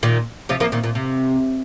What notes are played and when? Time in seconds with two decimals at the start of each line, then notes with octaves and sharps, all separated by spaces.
0.03 A#2 D#3
0.49 C3 F3
0.60 F3 A#3
0.72 A#2 D#3
0.84 A#2
0.95 C3